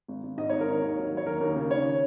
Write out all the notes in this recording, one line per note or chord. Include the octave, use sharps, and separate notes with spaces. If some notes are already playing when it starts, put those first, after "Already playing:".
G#1
G#1
G#2 D#5
G#1 C#5
A#4
D#3 C#5
D#2
F#3
F#3
C#5
D#2 A#4
D#2
C#3
D#3 C#5